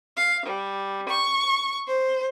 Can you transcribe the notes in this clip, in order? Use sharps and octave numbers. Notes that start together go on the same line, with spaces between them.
F5
G3
C#6
C5